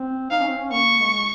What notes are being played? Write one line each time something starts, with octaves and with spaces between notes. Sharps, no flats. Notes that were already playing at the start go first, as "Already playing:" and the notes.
Already playing: C4
D#4 F5
C#4
C4
C#4
A#3 C#6
G#3